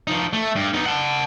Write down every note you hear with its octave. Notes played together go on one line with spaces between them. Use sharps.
F3 D#4
A3
G2
B3 D#4
F#5 A5